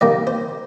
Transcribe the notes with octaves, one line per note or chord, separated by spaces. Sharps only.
G2 D#3 A#3 D5
C5